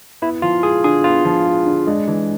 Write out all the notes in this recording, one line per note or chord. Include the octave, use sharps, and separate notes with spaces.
B3 E4
F3 F4
G#3 G#4
D3 G#4
B3 F4
F3
G#3
D3
G#3 D4
E3